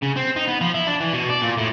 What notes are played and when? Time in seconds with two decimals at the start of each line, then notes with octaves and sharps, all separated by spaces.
0.03 C#3
0.17 C4
0.36 D#4
0.48 B3
0.61 F3
0.74 E4
0.87 D4
1.01 E3
1.13 B2
1.30 D5
1.42 A#2
1.58 A2